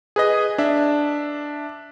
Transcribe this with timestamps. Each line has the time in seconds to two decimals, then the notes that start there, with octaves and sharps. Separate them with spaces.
0.16 G#4 B4 D#5
0.58 D4 E5